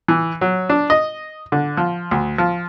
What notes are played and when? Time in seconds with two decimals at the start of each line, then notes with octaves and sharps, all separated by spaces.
0.08 E3
0.41 F#3
0.69 D4
0.90 D#5
1.52 D3
1.77 F3
2.11 D2
2.38 F3